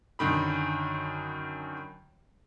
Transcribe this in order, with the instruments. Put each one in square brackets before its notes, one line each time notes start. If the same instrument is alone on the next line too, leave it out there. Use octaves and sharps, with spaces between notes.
[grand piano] F#2 D3 D#3 B5